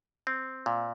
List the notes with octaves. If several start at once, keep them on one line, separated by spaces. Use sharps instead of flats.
C4
A#2